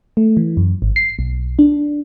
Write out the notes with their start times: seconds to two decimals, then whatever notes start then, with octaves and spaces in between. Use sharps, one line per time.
0.17 A3
0.37 E3
0.57 F#2
0.82 G#1
0.96 C7
1.19 B1
1.59 D4